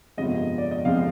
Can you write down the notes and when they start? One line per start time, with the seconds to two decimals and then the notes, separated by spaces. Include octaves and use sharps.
0.17 G1 F2 C3 F3 G#3 D#5
0.58 D5
0.71 D#5
0.85 G1 F2 C3 F3 G#3 F5